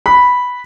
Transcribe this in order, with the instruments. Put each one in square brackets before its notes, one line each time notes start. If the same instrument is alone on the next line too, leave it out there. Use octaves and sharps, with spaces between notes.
[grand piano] B5